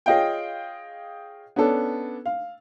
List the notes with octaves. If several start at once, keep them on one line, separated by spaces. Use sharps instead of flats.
F4 G#4 C#5 D#5 F5 G5
B3 C#4 D4 A4
F5